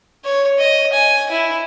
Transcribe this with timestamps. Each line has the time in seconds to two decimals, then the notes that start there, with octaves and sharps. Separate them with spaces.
0.25 C#5
0.58 D#5
0.93 G#5
1.31 E4